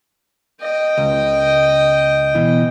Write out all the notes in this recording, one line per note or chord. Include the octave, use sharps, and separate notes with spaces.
D#5 G5
C#2
B2 E3